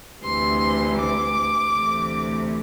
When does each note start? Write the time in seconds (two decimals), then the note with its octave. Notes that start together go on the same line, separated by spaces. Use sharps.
0.24 D2 C3 E3 C6
0.98 D6
1.71 D2 C3 E3 A3